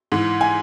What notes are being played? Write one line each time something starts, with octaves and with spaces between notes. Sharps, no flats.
G#2 E3
G#5